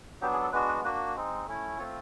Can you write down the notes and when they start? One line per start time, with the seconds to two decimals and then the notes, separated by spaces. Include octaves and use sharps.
0.21 F#3 B3 D4 G4
0.32 G#4
0.42 A4
0.52 G#3 B3 D4 F#4 B4
0.68 B4
0.84 A#3 D4 F#4 B4
1.15 G#3 C4 D#4
1.47 A3 C#4 E4
1.78 A3 C4 F4 C#5